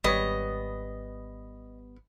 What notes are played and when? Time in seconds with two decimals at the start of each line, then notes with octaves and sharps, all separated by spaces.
0.04 G#1 G3 B3 C#5 D#5